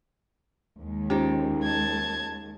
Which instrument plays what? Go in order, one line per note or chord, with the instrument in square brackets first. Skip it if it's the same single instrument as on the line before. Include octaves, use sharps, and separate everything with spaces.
[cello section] D#2 G#3
[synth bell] C#4 F4 C5 [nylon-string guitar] D#4 G4
[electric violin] A5 G#6